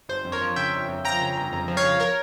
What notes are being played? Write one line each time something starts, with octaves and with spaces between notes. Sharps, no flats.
G1 C5
F2
A#4 C#5
F3
C#3 E5 G5
G1
F2
F3 G5 A#5
C#3
G1
F2
F3
C#5 F5
C#3
A#4 C#5